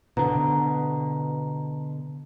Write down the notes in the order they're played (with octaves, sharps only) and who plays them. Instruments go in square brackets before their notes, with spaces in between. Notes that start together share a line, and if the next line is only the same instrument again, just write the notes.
[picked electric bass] B2 D3 [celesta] A#5